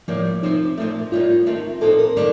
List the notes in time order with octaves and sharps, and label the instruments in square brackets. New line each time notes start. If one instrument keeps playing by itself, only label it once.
[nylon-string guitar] A2 G3 A#3 [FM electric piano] F3
[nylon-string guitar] C3 F3 C4 [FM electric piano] D#4
[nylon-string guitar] A#2 F3 A3
[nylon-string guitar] A2 G3 A#3 D#4 [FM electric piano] F4
[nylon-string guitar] D#3 A3 C4
[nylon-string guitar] A#2 F3 C4 D#4 [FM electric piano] A4
[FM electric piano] A#4
[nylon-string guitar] D#3 G3 A#3 D4